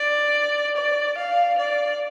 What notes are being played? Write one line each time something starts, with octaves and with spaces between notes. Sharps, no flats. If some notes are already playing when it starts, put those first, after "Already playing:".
Already playing: D5
D5
F5
D5